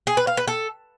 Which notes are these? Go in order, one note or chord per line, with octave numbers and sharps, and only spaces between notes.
G#4
B4
F5
B4
A4